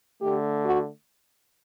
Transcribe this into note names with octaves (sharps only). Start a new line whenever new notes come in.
D3 A3 G4
F#4